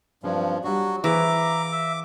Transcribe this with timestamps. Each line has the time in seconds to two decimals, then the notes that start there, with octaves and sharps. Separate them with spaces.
0.23 G2 F3 F#3 C4 C#4
0.64 F#3 G3 D4 F#4
1.04 E3 G#4 C5 E5 F5 A#5 D6
1.72 E5